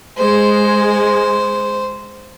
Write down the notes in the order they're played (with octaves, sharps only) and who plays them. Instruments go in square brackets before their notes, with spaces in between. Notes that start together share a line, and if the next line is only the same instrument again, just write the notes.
[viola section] G#3 [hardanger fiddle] C5